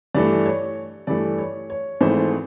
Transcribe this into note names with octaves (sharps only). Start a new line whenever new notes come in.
G2 E3 A3 D5
C#5
G2 E3 A3 D5
C#5
C#5
G#1 G#2 E3 A3 C5